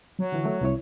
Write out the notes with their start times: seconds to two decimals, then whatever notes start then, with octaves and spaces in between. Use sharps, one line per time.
0.19 F#3
0.32 D3 E3
0.45 A3
0.61 C2 E4 C#5